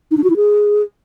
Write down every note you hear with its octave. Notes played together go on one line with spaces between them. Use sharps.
D#4
D4
F#4
E4
G#4